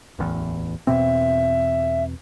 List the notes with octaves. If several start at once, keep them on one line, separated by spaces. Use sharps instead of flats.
D1 A1 E2
E2 B2 C4 E5